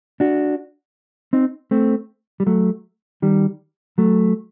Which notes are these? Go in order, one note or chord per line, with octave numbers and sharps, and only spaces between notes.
D4 F#4
C4 D#4
A3 C4
G3
F#3 A3
D#3 G3
F#3 A3